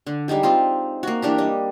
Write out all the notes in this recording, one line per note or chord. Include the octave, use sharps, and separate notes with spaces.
D3
G3 G#3 D#4 G4
C4 F4 D#5
A#3 F#4
E3 D4 G4 A#4
G3 D#5